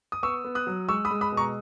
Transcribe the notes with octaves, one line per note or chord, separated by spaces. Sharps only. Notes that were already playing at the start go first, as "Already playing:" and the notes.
D#6
B3 C#6 E6
B3
D#6 F#6
F#3
G#3 C#6 E6
B5 D#6
G#3
B5 D#6
B2
A#5 C#6